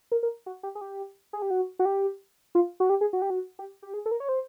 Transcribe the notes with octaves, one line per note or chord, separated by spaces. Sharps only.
A#4
A#4
F#4
G4
G#4
G4
G#4
G4
F#4
F#4
G4
F4
F#4
G4
G#4
F#4
G4
F#4
G4
G4
G#4
A4
A#4
C#5
C5